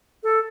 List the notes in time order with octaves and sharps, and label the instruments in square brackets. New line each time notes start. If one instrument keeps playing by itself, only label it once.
[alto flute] A4